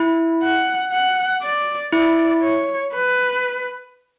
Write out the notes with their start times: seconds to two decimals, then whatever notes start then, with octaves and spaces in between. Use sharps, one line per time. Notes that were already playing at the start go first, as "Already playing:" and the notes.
Already playing: E4
0.42 F#5
0.92 F#5
1.43 D5
1.92 E4 D5
2.42 C#5
2.93 B4